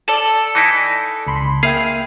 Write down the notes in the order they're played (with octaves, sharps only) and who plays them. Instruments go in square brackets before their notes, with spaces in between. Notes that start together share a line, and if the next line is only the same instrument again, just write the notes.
[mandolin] A4 D5 [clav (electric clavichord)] A5
[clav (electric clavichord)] E3 D#4 E4
[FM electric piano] C#2 B5 C6
[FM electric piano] A#3 E5 G5 [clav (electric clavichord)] G#4 F5 [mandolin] F6